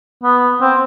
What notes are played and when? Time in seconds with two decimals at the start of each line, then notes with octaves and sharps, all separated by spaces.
0.23 B3
0.61 C4